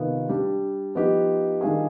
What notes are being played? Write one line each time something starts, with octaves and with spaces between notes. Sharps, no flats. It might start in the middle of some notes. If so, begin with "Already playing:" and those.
Already playing: C3 D#3 B3 F4
G3 D4 G4
F3 B3 D#4 G4
D#3 G3 D4 F4 G#4